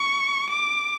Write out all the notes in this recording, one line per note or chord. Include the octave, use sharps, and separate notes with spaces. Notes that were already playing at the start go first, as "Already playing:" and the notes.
Already playing: C#6
D6